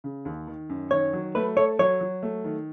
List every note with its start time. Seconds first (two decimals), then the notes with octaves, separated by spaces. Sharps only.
0.04 C#3
0.25 D#2
0.47 D#3
0.69 F#2
0.91 D#3 C#5
1.13 F#3
1.35 A3 B4
1.57 A4 C#5
1.79 F#3 C#5
2.01 F#3
2.23 A3
2.44 D#3